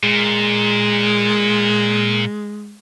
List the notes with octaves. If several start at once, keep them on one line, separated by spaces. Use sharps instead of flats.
A#2 G#3